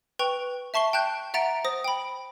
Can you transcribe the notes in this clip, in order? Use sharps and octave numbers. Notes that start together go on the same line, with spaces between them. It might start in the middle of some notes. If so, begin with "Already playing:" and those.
B4 G5 C#6 F7
E5 A5 C#6 C7 G7
G5 A5 F#6 G6
E5 F#5 A#5 A6 D7
C5 D#6 A#6
G5 B5